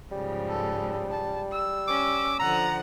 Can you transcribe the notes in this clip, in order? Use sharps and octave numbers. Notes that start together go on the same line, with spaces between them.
G#2 C#3 F3 G3
A4
A5
E6
C#4 D6
D3 F3 F#5 A#5